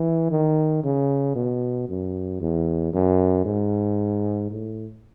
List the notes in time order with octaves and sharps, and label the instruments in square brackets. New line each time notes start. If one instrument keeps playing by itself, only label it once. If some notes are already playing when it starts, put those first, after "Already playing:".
Already playing: [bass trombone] E3
D#3
C#3
B2
F#2
E2
F#2
G#2
A2